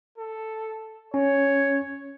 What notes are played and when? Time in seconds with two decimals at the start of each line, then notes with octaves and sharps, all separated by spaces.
0.18 A4
1.14 C#4 C#5